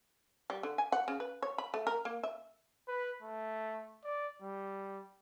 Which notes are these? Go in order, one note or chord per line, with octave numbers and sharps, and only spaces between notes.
G3
D3
G#5
F#5
C#3
B4
C#5
B5
A3
A#4
A#3
E5
B4
A3
D5
G3